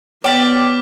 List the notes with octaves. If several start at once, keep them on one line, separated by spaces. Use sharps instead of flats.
B3 G4 C#5 D5 D6 F6 B6